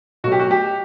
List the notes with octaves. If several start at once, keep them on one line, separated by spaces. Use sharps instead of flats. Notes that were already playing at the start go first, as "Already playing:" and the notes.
B2 F#3 A3 F#4
G4
F#4
G4